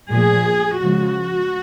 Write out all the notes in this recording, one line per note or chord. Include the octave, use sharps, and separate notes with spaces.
A#2 F3 A3 G#4
C#3 F3 G#3 F#4